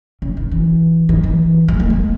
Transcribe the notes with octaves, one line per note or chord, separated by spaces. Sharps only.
C#3
D#3
E3
D#3
E3
G#3
A#3
G#3